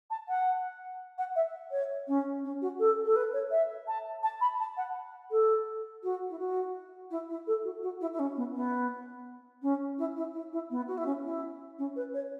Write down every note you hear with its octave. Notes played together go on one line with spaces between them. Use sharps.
A5
F#5
F#5
E5
C#5
C#4
C#4
F#4
A4
A4
B4
C#5
E5
A5
A5
B5
A5
F#5
A4
F#4
E4
F#4
E4
E4
A4
F#4
F#4
E4
E4
C#4
B3
B3
C#4
E4
E4
E4
E4
B3
F#4
E4
C#4
E4
C#4
B4
C#5